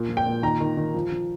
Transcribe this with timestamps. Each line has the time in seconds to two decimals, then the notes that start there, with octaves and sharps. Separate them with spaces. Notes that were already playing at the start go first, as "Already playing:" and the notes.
Already playing: A#2
0.09 F3
0.17 G5
0.26 A#2
0.43 D#3 A#5
0.60 D#3
0.77 D#3
0.94 F3
1.12 F3